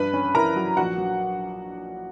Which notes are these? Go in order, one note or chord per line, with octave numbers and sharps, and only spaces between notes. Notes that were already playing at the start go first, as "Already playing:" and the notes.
Already playing: G2 B4 B5
C#4
E4 A#4 A#5
F#3
A#1 F#4 F#5
F#3